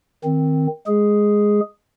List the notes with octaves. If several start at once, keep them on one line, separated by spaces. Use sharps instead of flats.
D#3 C4
G#3 G#4